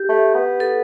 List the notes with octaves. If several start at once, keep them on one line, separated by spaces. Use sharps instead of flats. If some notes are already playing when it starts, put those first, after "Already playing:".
Already playing: G4
A3
B3
A4